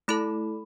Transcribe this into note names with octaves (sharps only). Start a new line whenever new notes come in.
A3 E4 A4 B5